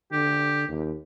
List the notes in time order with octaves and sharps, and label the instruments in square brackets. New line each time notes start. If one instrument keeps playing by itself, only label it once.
[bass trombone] D3 [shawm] G4
[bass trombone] D#2